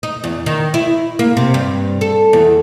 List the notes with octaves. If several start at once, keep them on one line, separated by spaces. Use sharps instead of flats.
D#4
E2
D#3
E4
A#3
C3
G2
A4
E2